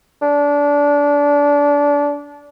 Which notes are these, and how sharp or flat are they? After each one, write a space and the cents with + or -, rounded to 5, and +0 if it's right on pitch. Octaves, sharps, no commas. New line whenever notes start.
D4 -25